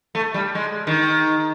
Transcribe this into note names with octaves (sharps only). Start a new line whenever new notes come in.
A3
G3
G#3
D#3